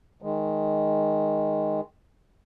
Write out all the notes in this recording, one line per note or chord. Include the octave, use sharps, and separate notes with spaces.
D#3 G#3